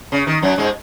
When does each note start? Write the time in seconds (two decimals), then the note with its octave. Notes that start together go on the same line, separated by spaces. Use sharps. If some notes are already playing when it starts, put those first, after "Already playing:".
0.12 C#3
0.27 D#3
0.42 F#2 F#3
0.58 G#2 G#3